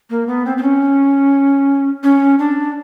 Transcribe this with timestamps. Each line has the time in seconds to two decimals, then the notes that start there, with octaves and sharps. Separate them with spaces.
0.10 A#3
0.27 B3
0.45 C4
0.57 C4
0.62 C#4
2.03 C#4
2.39 D4